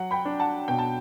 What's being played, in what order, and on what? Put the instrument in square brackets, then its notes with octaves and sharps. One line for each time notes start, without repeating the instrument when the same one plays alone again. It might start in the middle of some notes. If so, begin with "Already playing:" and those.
Already playing: [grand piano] F#3 F#5
G5 B5
D4
F#5 A5
B2 G5
A5